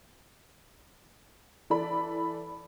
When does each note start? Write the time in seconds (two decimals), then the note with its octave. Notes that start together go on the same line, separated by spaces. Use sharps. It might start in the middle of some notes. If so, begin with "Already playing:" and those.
1.70 E3 A4 D5 B5